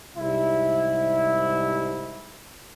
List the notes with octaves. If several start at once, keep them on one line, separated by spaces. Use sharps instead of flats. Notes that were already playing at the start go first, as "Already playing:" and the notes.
C2 G#2 G3 E4